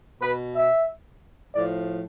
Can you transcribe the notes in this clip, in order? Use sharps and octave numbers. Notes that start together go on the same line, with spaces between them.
B2 B4
E5
A2 F3 D5